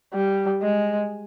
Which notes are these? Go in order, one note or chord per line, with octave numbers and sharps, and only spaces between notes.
G3
G#3